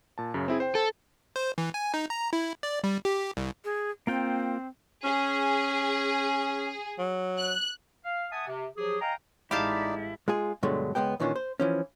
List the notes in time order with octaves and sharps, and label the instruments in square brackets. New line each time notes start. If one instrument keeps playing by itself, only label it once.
[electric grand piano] A#2 A5
F#2 C#3
C4 E4 G#4
C5 G5
[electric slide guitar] A4
[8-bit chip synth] C5
E3
G#5
D#4
A#5
E4
D5
G3
G4
C2
[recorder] G#4
[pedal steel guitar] A#3 F4 G5 [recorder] C4
[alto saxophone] C#4 [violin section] G#4
[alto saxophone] F#3
[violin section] F#6
[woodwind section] F5
E5 F#5 G#5 A5 D#6
C3
F3 F#3 G4 G#4
D#5 F5 G5 G#5 A#5
[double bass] A1 G#3 [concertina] D#4 D5 [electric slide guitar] E4 [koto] G4 F5 A5
[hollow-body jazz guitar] G#3 F4 G#4
G2 B2 D3 F#3 G#3 A3
C#2 B2 G#3 B3 G5
A#2 D#3 E3 C#4 D4 F4
C5
E3 F3 C#4